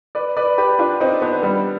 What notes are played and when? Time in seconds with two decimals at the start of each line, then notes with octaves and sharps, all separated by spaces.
0.15 B4 D5
0.37 B4 D5
0.58 G4 B4
0.79 D4 F4
1.00 C4 D#4
1.22 B3 D4
1.43 G3 B3